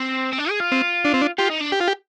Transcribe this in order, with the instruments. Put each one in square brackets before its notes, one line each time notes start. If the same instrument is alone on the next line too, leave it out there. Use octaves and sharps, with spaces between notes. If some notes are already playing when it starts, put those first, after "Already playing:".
Already playing: [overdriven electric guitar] C4
C4
D4
G#4
F4
[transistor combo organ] C4
D4
C4
D4
[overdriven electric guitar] F4 [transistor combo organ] G4
[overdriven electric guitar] D#4
D4
[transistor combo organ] G4
F4
G4